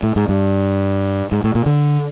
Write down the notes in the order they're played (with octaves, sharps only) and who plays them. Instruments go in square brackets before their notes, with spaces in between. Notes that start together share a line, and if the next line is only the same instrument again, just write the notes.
[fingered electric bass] A2
G#2
G2
G#2
A2
A#2
D3